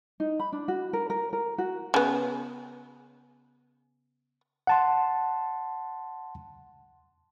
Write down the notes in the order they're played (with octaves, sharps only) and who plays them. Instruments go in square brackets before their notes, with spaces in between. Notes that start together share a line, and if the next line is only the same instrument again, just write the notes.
[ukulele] D#4
B5
D4
F#4
A#4
A#4
A#4
F#4
[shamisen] C#3 B3
[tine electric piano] F#5 A5 C6